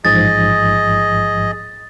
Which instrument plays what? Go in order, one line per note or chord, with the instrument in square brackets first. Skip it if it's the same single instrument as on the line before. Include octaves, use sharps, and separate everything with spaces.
[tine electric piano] A1 G#2 F3 [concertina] G#4 D#5 [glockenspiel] A6